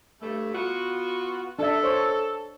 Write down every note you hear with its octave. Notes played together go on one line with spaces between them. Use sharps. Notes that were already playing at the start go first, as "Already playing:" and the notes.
G2 A3
B3 F4 F#4
D4 A4 E5
C5 C#5